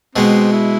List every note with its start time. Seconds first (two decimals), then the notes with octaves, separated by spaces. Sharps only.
0.15 B2 G#3 B3 C4
0.52 E4